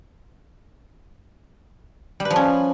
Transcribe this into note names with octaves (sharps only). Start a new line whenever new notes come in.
G3
B4
F3
C#4